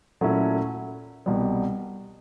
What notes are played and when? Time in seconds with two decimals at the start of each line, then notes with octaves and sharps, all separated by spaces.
0.21 A#2 F#3 A3 C#4 E4
1.26 C2 B2 G3